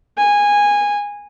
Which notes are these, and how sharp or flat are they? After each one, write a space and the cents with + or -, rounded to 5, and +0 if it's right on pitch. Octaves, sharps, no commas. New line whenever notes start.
G#5 -15